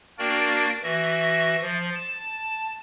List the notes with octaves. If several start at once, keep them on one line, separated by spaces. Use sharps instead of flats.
A#3 D4 F#4 A#4 D5 G5
E3 F#4 E5 A#6
F3
A5